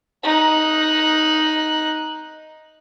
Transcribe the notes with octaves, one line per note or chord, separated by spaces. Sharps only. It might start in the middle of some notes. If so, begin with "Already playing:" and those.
D#4 F#6